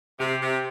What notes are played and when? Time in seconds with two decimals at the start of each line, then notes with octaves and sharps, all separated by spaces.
0.20 C3 G4
0.41 C3